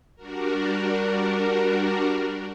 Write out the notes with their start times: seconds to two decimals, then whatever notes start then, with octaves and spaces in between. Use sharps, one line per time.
0.16 G3 D4 F#4 A#4